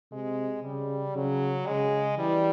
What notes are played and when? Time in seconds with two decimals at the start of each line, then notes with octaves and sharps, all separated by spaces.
0.12 C3 G#3
0.64 C#3 G3
1.16 C#3 F#3
1.67 C#3 G#3
2.18 E3 G3